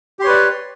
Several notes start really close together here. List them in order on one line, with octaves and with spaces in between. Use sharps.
G4 C6 C#5 B4 D5